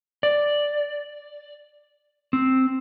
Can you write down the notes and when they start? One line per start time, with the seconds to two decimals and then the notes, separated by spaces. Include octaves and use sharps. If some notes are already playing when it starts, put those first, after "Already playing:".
0.23 D5
2.33 C4